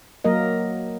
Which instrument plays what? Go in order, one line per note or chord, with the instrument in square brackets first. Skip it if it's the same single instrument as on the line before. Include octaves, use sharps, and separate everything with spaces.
[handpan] F#3 A#3 A#4 D#5